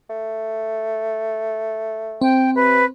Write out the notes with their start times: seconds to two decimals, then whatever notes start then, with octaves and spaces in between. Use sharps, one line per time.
0.10 A3
2.21 C4 G5
2.55 C3 B4